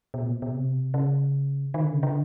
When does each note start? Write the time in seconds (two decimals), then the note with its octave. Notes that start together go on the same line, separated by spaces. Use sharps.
0.14 B2
0.22 A#2
0.30 B2
0.42 B2
0.55 C3
0.94 C#3
1.74 D#3
1.84 D3
1.94 C#3
2.03 D3